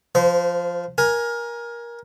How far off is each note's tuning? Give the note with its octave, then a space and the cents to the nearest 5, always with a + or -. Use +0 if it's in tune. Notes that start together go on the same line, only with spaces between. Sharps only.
F3 +0 C5 -30
A#4 +20 G#5 +0